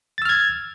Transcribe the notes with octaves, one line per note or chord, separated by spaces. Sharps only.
E6 F6 G#6 A6